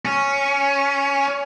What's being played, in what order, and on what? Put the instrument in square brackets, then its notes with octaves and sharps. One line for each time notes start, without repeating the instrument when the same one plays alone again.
[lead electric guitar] C#4